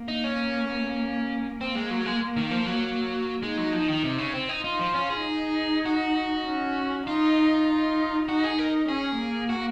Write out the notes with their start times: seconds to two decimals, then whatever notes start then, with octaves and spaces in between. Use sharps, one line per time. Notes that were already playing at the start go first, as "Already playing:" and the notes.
Already playing: A#3
0.08 D#4
0.24 C#4
1.60 A#3 C4
1.75 G#3
1.91 F#3
2.06 G#3
2.37 D#3
2.51 F3
2.66 F#3
3.42 G#3 D#4
3.57 F#3
3.73 F3
3.88 D#3
4.03 C3
4.18 C#3
4.34 C4
4.49 D#4
4.64 D#4 F4
4.79 F3
4.94 C#4
5.10 G#4
5.25 D#4
5.86 F#4
6.45 C#4
7.07 D#4 F4
7.68 D#4
8.28 D#4 F#4
8.44 G#4
8.59 D#4 A#4
8.89 C#4 G#4
9.19 A#3
9.49 F#4